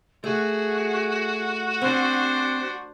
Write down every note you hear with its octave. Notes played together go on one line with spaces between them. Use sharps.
A3 F#4 G#4
C4 D4 C5